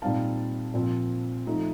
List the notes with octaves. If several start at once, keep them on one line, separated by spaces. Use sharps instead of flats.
A#2 G3 C4 D#4 F5 A5
A#2 F3 C4 F4
F3 A3 D#4